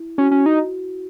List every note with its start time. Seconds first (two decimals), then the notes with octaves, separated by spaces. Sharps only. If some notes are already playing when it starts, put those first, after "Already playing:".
Already playing: E4
0.18 C#4 F#4
0.31 C#4 F#4
0.46 D#4 F#4